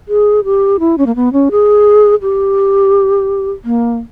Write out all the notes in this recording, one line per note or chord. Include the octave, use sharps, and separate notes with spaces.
G#4
G4
E4
C#4
A#3
B3
C#4
G#4
G4
A#3